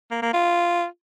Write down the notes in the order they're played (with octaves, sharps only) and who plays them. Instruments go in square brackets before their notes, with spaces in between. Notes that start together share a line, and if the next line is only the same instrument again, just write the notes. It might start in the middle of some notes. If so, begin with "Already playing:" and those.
[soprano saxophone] A#3
A#3
F4